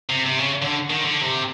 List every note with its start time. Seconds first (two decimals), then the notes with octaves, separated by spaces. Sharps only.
0.09 C3
0.26 C3
0.38 C#3
0.62 D3
0.90 D#3
1.05 D3
1.22 C3